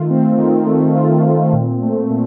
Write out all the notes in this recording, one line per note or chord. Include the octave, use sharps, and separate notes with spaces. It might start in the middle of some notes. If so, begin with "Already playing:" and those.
Already playing: D#3 A3 F4
C4
D#3
A3
F4
C4
A#2
A3
A#2